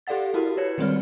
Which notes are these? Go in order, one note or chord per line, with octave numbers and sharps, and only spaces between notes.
G4 A4 D5 F5 F#5 A6
E4 F#4 G4 A#4
B4 C#5 G#6 C#7
D#3 G3 G#3 C4 D5 F6